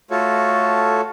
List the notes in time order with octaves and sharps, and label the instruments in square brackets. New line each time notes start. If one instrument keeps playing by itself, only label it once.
[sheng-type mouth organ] A3 F4 F#4 A4 C#5